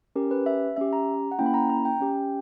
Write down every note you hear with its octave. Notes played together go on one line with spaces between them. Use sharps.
C#4 G4 A#4
B4
E5
C#4 G4 E5
A#5
F#5
A#3 C#4 E4 G5
B5
A#5
A#5
G5
C#4 G4